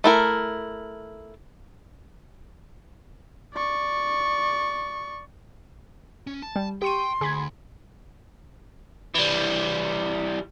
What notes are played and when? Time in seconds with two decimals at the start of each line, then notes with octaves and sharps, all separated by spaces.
0.04 A3 E4 A#4
3.54 D5 C#6
6.27 C#4
6.42 A5
6.56 G3
6.82 G4 G5 C6 C#6 D#7
7.21 D2 G#4 B5 G#6
9.14 E3 G3